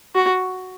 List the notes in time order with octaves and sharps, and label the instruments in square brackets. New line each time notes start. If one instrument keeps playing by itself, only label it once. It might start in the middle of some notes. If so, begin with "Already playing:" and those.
[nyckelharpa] F#4